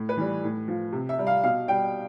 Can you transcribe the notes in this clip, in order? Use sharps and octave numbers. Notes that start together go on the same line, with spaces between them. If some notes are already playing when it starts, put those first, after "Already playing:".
Already playing: A2
B4
E3 G3
A2
F3
C3
E5
G3
F5
B2 F5
G3 G5